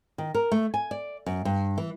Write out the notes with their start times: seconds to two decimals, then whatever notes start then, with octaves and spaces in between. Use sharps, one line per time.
0.18 D#3
0.34 A#4
0.52 A3
0.74 G#5
0.91 D5
1.26 F#2
1.45 G2
1.78 E3